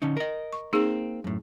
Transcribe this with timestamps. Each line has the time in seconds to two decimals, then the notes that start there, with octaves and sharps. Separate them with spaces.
0.02 D3 C#4 D#4
0.17 A#4 D#5
0.53 C#6
0.73 A#3 C4 D#4 G#4
1.24 F#2 A2